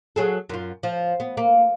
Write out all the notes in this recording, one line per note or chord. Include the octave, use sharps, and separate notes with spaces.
F#3 G#4 A4
F#2 F4
F3
B3
A#3